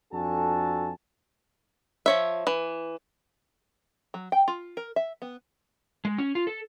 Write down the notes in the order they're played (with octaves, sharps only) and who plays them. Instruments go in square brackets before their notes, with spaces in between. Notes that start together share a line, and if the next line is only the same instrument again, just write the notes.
[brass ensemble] F2 D4 F#4 A4 G#5 A5
[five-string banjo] F3 C#5 E5
E3
F#3
G5
F4
A#4
E5
B3
[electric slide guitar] G#3
C#4
F4
A4